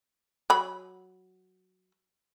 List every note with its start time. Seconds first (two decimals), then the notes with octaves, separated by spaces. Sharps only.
0.50 F#3 B5